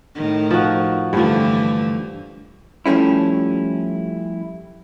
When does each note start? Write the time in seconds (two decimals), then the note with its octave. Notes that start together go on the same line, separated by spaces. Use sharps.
0.15 A2 D#3
0.51 F3 F#4
1.13 G2 D3 E3 F3 A3
2.86 F3 G3 A3 C#4 E4